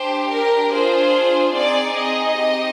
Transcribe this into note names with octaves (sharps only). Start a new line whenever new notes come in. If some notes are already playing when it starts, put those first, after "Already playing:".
Already playing: D4 G4 C5
A#4
D4 F4 G#4 C5
C4 D#4 G#4 D5
D#5
C4 D#4 G4